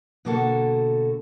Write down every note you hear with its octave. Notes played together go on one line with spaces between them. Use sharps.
B2 D3 A#3 F#4 G4 A4